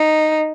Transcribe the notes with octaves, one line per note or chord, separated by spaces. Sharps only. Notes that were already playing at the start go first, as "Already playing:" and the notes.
Already playing: D#4